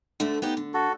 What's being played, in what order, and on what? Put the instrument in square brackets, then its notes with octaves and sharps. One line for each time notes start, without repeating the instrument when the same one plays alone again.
[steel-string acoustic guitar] D2 D3 A3
B3 D#4 G4
D3
[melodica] F#4 A4